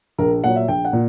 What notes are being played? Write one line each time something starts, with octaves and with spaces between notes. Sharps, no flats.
A#1 A#4
A#2 F#3 F#5
E5
A#1 G5
F#5
A#2